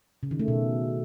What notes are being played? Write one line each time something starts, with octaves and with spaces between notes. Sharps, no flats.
C#3
D#3
A3
B2